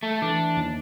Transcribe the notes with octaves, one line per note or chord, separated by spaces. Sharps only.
A3
E3 D4
D#2